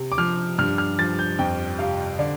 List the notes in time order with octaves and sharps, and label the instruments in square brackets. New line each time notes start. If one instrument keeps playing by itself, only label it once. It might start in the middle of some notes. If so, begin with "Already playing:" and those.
Already playing: [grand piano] C3
D6
F3 F6
G2 F6
F6
F3 A6
G6
F2 G5
C3 F5
D3 D5